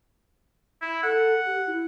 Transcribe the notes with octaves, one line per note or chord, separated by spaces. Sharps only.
E4
A4 F#5
G4
E4